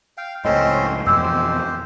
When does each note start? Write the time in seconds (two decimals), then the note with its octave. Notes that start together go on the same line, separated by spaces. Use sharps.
0.17 F5 G5
0.45 C#2 A2 C4 C#4 D#5 C6
1.07 F2 B2 E3 G#3 G4 C5 E6